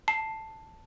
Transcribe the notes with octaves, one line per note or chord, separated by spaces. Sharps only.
A5 C7